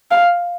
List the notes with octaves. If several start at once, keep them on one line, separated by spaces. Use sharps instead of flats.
F5